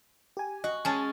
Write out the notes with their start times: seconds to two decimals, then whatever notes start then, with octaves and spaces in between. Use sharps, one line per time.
0.37 G4 G#5
0.64 F#4 D#5
0.85 G#3 C#4 G#5 A5 A6